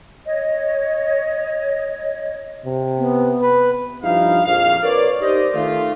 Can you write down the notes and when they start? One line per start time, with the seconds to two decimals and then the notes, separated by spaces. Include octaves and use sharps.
0.25 C#5 D#5
2.65 C3
2.99 B3
3.42 B4
4.02 G2 F3 D#4 E4 F5
4.45 A#1 F2 F5
4.83 A#4 B4 C#5 D5
5.21 D#4 G4 C5 D5 D#5
5.54 D#3 A3 F4